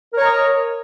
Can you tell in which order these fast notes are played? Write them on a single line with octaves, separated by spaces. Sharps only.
A#4 C#5 A#5 D#5